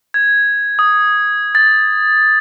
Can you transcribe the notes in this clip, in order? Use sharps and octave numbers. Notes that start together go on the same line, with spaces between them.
G#6
D#6
A6